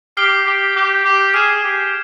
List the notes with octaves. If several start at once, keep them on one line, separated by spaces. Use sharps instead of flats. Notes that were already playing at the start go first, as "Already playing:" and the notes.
G4 F6 C7 G7
G4
G4
G4
G#4 F6 G#6 E7
G4